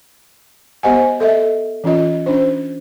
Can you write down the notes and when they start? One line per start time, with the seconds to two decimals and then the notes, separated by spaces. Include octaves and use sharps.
0.83 B3 G4 C5 D#5 F#5 G#5
1.20 A4 D#5 E5
1.84 E3 C#4 F4 D#5
2.26 C#4 D4 C5